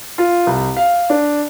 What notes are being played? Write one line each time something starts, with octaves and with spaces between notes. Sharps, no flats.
F4
C2
F5
D4